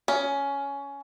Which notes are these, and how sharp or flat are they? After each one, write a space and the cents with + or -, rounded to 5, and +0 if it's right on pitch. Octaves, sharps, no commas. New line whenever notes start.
C#4 +15